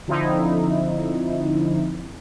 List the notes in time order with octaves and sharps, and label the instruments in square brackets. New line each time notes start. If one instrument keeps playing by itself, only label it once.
[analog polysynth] D3 F3 C4 D#4 E4